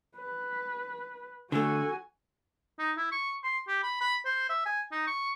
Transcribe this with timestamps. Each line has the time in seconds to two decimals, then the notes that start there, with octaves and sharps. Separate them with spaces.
0.17 B4
1.52 D3 A3 F#4 A4 G#5
2.79 D#4
2.97 E4
3.12 C#6
3.44 C6
3.68 G4
3.83 B5
4.01 B5
4.25 C5
4.49 E5
4.66 G#5
4.92 D#4
5.07 C#6